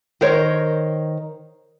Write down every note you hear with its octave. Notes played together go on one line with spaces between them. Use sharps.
D#3 A#4 C5 C#5